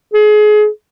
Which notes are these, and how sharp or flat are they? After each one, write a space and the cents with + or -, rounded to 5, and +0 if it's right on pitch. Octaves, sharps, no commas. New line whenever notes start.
G#4 +30